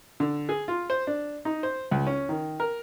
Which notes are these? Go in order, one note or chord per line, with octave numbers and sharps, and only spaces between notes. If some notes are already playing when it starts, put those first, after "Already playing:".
D3
G#4
F4
C5
D4
D#4
C5
C#2
C#4
D#3
A#4